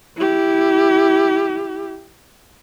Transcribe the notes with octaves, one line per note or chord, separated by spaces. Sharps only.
E4 G4